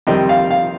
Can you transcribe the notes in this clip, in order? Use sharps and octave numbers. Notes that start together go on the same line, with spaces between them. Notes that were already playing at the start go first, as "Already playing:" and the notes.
F2 C3 D#3 G3 C4 D#5
F5
F5